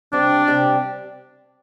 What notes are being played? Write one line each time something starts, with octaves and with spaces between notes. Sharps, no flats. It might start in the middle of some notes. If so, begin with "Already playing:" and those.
C3 G3 C4 D4 G4
C3 G3 C4 G4